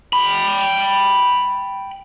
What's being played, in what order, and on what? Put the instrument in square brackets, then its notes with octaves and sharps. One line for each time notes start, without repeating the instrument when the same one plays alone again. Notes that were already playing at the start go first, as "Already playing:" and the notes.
[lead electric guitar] G5 B5